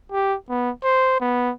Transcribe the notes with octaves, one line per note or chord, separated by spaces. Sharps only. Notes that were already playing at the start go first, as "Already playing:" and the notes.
G4
B3
C5
B3